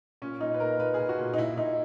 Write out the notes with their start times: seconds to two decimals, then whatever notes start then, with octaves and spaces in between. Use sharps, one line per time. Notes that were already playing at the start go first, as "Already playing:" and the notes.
0.22 A#2 C#4
0.41 A#2 D#4
0.54 B4
0.60 A#2 A#4
0.79 A#2 B4
0.94 G#4
0.99 A#2
1.09 F#4
1.18 A#2
1.34 D#4
1.38 A#2 E4
1.57 A#2 D#4